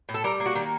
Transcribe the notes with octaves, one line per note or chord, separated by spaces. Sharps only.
A2
A4
G3 A#4
A#3
F#4
D#3